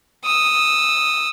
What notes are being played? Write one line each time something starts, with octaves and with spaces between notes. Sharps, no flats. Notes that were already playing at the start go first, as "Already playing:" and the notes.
D#6 E6